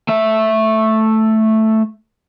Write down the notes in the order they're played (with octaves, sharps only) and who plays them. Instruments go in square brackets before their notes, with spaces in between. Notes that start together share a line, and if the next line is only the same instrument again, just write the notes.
[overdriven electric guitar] A3 E5